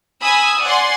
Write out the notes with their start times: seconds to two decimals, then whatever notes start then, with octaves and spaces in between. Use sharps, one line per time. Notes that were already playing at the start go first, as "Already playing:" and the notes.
0.21 G#5 B5 D#6 E6
0.62 D5 F#5 G#5 C6